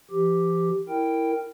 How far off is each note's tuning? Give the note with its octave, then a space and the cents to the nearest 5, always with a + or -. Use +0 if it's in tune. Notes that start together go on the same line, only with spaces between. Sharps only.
F3 -45 G4 +0
E4 +0 A#4 -10 G5 +0